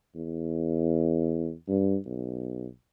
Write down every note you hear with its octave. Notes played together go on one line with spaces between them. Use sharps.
E2
G2
B1